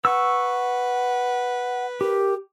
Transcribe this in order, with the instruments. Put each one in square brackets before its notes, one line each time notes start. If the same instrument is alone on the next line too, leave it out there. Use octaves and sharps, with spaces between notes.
[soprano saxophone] B4 [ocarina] F#5 [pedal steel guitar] C#6 E6
[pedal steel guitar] G4 [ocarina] A#4